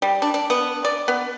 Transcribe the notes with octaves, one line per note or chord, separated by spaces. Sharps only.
G3
D4
D4
B3
D5
B3